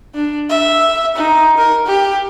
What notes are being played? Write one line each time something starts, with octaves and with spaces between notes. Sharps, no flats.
D4
E5
D#4
A#4
G4